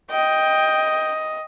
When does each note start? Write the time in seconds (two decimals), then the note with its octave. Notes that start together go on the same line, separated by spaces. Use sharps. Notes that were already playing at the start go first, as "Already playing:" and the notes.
0.11 D#5 G5